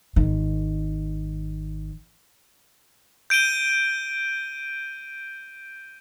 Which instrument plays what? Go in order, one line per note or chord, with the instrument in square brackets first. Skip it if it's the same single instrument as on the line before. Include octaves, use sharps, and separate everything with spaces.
[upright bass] G#1 D#3
[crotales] G6 D7 D#7 G7